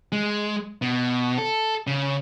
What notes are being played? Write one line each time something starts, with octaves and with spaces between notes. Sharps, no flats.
G#3
B2
A4
C#3